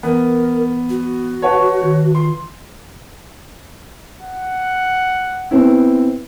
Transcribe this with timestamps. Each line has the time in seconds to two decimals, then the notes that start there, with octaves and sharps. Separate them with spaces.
0.03 E3 B3 A#4
0.90 F#4
1.42 B4 C#5 F#5 A5 C#6
1.82 D#3
2.15 F4 C6
4.21 F#5
5.51 B3 C4 E4